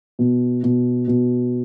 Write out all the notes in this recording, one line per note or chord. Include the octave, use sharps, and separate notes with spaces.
B2
B2
B2